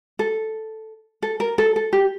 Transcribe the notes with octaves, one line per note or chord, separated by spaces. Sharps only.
A4
A4
A#4
A4
A4
G4